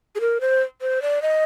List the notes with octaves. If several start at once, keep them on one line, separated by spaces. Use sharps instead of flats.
G#4
A#4
C5
C5
D5
D#5